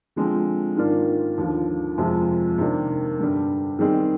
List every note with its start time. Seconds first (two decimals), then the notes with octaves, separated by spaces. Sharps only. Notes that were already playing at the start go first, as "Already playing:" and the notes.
0.16 D3 F3 G#3 C4
0.77 G#2 D#3 A#3 D4 F4
1.38 D#2 D3 F3
1.98 F2 C3 F3 G#3
2.58 C3 D#3 A#3 D4
3.19 G2 D3 G3
3.79 D#3 G3 C4 D#4 G#4